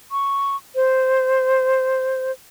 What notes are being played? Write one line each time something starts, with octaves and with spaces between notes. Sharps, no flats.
C#6
C5